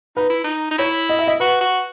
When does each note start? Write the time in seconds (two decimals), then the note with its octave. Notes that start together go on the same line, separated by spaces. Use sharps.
0.17 D#4 B4
0.30 E4
0.44 D#4
0.71 D#4
0.78 E4 C#5
1.09 D#5
1.19 E5
1.27 D#5
1.40 F#4 B4
1.61 F#4